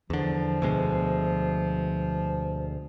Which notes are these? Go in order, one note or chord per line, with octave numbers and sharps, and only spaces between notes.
E2 D3 F3
D2 B2 G#3